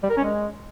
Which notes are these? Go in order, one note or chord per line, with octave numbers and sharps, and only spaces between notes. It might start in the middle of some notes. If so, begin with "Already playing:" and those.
G3
A#4
C#4
G#3